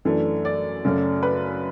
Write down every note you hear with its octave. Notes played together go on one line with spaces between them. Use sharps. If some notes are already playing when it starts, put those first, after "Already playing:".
F#2 E3 A3 D4
D5
F#2 C#3 F#3 A3
B4